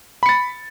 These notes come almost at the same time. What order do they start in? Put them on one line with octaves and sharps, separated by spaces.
B5 C#7 A6